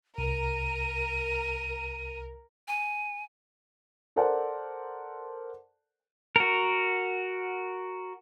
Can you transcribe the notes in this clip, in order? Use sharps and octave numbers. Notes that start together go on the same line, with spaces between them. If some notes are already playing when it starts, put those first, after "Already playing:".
C2 A#4 D#7
G#5
A4 A#4 C5 D5 F#5 A5
F#4 A#4